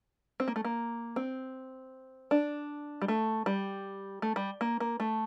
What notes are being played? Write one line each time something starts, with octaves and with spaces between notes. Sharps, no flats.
C4
A#3
A3
A#3
C4
D4
G3
A3
G3
A3
G3
A#3
A#3
A3